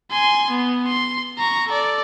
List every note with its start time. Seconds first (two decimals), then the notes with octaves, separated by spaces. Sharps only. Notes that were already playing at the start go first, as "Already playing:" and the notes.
0.11 G#5 C6
0.50 B3
0.87 C6
1.39 A#5 C#6
1.68 A4 D5